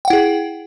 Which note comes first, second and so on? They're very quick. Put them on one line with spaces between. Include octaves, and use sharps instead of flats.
G5 F#5 E4 G#4